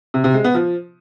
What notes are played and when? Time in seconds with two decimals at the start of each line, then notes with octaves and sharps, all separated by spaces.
0.14 C3
0.24 C3
0.34 G#3
0.44 B3
0.55 F3